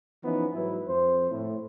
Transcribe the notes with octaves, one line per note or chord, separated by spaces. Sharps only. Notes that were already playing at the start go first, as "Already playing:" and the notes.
E3 F3 B3 C#4 D#4
G#2 F#3 E4 B4
F2 C5
A2